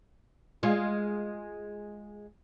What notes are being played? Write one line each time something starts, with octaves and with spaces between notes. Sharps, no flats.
G#3 F4